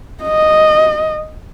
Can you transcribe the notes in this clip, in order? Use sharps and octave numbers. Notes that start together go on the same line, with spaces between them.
D#5